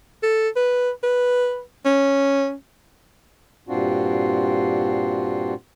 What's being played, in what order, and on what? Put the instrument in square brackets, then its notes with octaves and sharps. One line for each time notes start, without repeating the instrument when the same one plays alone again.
[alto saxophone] A4
B4
B4
C#4
[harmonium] G2 A#2 C4 D4 F4 F#4